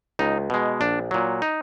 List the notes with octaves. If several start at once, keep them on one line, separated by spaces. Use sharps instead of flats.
C#2 D#4
B2 G#3
A#1 D4
A#2 F#3
D#4